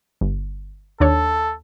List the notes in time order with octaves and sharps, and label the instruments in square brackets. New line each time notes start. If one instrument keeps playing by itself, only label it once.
[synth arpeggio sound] G1
[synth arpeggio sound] D#2 D4 C#5 [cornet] A4